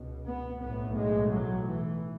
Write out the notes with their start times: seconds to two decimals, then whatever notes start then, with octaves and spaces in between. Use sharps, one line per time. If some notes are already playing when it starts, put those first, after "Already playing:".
Already playing: C#2 B2
0.26 B3
0.61 B1 A2 B3
0.95 G#3
1.30 F#3
1.65 E3